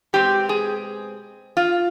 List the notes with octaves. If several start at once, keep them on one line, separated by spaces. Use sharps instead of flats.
B2 G#3 C4 G4
G#4
F4